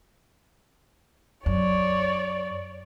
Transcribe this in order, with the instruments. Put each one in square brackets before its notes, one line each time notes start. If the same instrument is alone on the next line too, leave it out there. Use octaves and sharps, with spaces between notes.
[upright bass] F#2 [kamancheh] C#5 D5